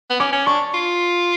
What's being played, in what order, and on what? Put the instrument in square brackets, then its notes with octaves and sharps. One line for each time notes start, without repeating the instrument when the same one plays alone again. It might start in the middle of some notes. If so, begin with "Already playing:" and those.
[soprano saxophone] B3
[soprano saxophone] C#4 [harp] D6
[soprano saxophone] C#4
[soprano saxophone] D4 [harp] C#6
[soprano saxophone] F4